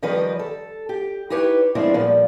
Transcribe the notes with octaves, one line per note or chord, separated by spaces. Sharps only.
D#3 F3 G3 B4 C#5 D#5
A4
G4
D#4 E4 G4 B4 C#5
F3 G#3 B3 C4 D4 E4
A#2 F3 G3